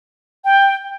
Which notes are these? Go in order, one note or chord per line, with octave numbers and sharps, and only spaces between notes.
G5